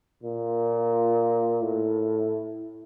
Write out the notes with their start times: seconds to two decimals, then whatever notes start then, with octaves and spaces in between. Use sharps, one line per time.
0.23 A#2
1.63 A2